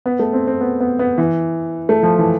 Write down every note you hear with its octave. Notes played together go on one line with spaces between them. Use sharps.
B3
A3
C4
C4
B3
B3
B3
E3
A3
F3
E3